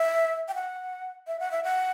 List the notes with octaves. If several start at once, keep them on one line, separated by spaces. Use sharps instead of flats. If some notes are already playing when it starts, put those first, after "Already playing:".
Already playing: E5
G5
F#5
E5
F#5
E5
F#5